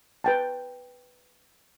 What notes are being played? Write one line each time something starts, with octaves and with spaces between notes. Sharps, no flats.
B4 G5 A5